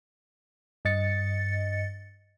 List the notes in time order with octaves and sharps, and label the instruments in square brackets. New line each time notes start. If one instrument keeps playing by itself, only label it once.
[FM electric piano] G2 D#5 A6 C#7